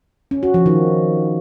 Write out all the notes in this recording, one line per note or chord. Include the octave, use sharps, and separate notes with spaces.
C#4
F#4
F3
D#3